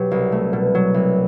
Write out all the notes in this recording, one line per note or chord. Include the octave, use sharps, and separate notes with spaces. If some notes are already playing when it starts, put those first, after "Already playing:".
Already playing: B2 F#3 G4
C2
A3
B2
F#3
C2